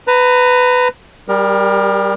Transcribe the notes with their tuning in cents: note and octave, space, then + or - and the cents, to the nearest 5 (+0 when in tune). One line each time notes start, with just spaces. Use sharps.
B4 +15 A#5 -15
G3 +0 G4 +40 A#4 +15